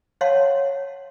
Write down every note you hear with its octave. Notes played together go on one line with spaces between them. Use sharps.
C#5 F5 F#5 A5 C6